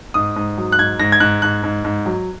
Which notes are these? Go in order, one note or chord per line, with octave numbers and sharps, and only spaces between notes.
G#2 D#6
G#2
F#3
F#6
G#2 G#6
G#2 A#6
G#6
G#2 F#6
G#2 F#6
G#2
G#2
F#3